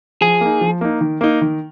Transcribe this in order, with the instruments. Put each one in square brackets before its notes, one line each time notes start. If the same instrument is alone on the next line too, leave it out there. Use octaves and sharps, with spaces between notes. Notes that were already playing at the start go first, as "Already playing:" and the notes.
[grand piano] F3 [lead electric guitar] G#4
[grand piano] A#3 D#4
F3
A#3 D#4
D#3
A#3 D#4
D#3